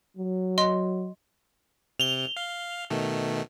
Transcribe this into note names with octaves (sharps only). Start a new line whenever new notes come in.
F#3
D#5 C6
C3 F7 G7
F5
B2 D#3 A3